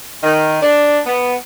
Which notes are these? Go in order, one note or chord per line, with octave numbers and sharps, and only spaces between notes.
D#3
D4
B3